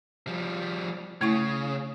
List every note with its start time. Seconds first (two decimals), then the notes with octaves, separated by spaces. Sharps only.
0.27 F3 G3
1.21 C#3 A3 E4 C#6